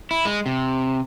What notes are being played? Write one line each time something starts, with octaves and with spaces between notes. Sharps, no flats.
E4
G#3
C3